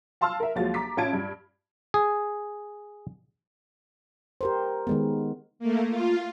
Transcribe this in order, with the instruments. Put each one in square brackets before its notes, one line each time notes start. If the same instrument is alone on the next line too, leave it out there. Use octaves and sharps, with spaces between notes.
[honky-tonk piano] F5 A5 C6 E6 F6
A#4 E5
D#2 F3 F#3 G#3 F5 A6
A#5 D6 B6
A1 C#4 F4 A5 G#6 D7
G2
[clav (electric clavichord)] G#4
[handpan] G4 A#4 C5
D#3 G#3 B3
[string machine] A3 A#3
F4